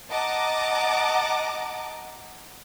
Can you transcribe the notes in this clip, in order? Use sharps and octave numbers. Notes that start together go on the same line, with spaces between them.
D#5 F#5 A5 A#5 D6